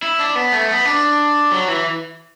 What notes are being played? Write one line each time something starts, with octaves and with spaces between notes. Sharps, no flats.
E4
D4
B3
A3
B3
D4
F#3
E3